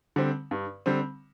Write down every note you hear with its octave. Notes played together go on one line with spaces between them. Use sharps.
D3 G3 C4
G2
D3 G3 C4